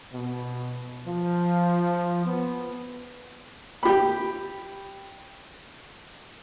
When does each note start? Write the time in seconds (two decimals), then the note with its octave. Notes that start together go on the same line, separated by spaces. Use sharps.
0.13 B2
1.06 F3
2.25 B3
3.83 G4 B5